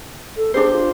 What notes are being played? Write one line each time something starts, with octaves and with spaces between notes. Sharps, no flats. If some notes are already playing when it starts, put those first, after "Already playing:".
A4
D4 G4 G#4 C5
F4